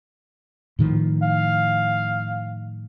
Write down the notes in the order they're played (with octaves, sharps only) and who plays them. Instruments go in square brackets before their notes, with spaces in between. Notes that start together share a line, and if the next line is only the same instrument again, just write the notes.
[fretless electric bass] A2 D#3 F3
[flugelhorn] F5